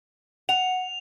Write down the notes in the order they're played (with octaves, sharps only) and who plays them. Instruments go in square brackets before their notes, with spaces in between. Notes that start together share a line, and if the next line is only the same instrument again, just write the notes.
[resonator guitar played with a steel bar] F#5 [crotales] F7